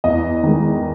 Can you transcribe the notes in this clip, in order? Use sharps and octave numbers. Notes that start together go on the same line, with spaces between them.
E2 D#5
D#3 G#3